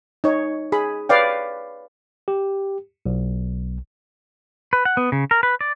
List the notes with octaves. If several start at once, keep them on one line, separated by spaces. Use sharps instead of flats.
D#4 C#5 D#5
G#4 B5
B4 C#5 D5 F5 G5
G4
B1
B4
F#5
B3
C#3
A#4
B4
D5